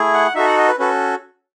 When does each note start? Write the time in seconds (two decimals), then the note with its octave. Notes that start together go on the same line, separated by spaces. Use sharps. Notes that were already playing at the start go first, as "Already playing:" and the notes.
Already playing: A3 E4 G#4
0.14 F#5
0.35 D#4 F#4 A4 E5
0.46 F#5
0.58 D#5
0.68 B4
0.79 C#4 F#4 A4 B4